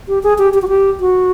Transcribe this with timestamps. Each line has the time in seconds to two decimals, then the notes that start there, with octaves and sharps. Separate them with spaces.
0.08 G4
0.23 G#4
0.38 G4
0.54 G4
0.62 F#4
0.68 G4
1.00 F#4